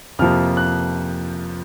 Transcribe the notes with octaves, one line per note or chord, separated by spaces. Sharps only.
F2 C3 F3 A#3 F6
F#6